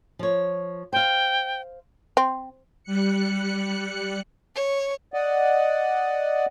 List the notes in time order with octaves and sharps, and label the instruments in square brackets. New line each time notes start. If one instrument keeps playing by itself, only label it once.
[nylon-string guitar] F3 C#5
[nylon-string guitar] C5 F5 [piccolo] G5
[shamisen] C4
[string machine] G3 F#6 C#7
[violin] C#5
[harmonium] D5 D#5 F#5